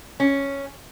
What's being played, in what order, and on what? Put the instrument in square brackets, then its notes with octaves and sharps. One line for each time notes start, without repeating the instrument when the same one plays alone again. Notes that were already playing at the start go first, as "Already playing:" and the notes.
[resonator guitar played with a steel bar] C#4